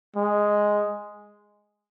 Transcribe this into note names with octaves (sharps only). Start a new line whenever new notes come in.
G#3